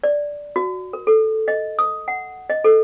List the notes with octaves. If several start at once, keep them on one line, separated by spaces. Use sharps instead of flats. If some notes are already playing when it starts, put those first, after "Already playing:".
D5
F#4
A#4
A4
D#5
D#6
F#5
D#5
A4